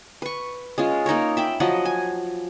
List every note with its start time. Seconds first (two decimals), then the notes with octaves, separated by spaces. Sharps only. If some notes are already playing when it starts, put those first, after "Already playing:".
0.22 B4 C#6
0.78 G#3 C#4 F4
1.06 A#3 D#4 A#4 C#5
1.37 E5 G5 B5
1.60 F3 F#3 D#5 F#5
1.85 G#5